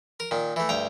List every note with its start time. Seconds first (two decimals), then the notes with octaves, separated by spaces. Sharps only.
0.20 A#4
0.31 A#2 D#3
0.56 E3 A3
0.69 D2 G2 G5 A#5